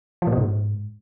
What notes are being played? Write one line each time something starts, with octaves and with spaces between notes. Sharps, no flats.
F3
A#2
B2
G#2